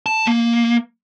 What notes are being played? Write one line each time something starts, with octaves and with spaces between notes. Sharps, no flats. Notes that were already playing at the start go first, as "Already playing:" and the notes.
A5
A#3